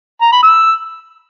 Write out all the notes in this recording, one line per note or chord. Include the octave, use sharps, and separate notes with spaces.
A#5
B5
E6